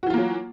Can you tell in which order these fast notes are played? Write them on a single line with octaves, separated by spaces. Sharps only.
F#4 E3 F4 A#3 F#3